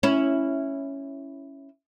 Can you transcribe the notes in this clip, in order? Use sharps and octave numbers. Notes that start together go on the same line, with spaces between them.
C#4 E4